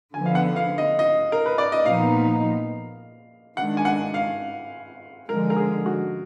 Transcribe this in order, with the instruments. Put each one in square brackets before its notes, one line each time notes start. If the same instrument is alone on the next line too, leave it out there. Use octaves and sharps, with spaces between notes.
[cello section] D3 F3 B3 [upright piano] G#5
[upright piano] F5
F#5
F5
D#5
D#5
A#4
B4
D5
D#5
[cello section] A#2 F3 B3 D#4 [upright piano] F5
[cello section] D#3 G#3 D4 [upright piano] F#5
[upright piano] G#5
F#5
F5
[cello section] D3 F3 G#3 [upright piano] A#4
[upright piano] A#4
G#4
F#4